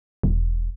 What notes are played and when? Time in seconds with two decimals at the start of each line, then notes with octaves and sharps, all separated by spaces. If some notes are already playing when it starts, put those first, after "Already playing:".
0.23 E1